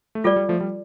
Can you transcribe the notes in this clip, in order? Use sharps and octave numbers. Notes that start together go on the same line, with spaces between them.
A3
G3 F4 A4 D5
G3
F3 A3
G3